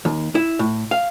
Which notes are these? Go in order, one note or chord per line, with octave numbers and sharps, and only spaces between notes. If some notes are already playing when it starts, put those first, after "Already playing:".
D#2
E4
A2
F5